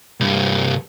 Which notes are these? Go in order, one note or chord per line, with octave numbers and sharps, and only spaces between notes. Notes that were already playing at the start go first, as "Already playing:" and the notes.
C2 G2